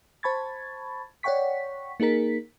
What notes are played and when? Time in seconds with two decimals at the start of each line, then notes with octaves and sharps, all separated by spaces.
0.23 C5 A5 B5 C#6 G#6 A6
1.23 C#5 D5 F#5 G5 C#6 B6
2.00 A#3 D#4 G#4 A#4 B6